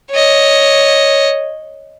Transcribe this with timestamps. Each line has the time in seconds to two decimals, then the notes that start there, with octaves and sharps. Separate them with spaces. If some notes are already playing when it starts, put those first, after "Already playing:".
0.11 C#5 D#5